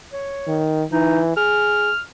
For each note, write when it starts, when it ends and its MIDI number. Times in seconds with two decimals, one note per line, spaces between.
0.13 0.62 73
0.48 0.83 51
0.92 1.35 52
0.92 1.20 63
1.37 1.90 68
1.37 2.00 89